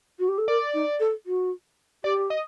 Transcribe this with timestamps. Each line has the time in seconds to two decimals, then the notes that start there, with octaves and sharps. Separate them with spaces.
0.19 F#4
0.28 G4
0.38 A4
0.48 A#4 D5
0.74 D#4
1.00 A4
1.26 F#4
2.04 G4 D5
2.30 D#5